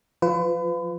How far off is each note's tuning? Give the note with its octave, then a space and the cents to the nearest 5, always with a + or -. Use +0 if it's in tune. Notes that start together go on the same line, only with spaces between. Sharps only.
F3 +0 F4 +0 B4 +35